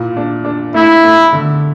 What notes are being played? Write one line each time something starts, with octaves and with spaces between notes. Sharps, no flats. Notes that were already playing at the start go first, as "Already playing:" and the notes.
Already playing: A#2 E4
D4
D4
A3 E4
A3
D3